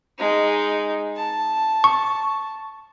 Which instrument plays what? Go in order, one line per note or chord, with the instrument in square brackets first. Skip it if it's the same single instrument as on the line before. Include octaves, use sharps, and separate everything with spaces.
[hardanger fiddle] G#3 D#4
A5
[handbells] C#6